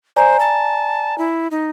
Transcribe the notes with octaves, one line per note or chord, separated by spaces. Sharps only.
C5 D5 G#5 A#5
A5
E4
D#4